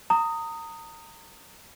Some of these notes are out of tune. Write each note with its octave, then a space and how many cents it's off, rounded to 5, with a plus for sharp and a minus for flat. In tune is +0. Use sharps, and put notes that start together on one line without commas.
A#5 -30 D#6 +0